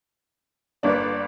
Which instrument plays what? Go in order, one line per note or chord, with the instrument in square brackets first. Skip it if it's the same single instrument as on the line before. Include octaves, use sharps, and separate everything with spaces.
[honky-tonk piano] G1 A#3 D4 [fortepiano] G2 B4 [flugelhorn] D5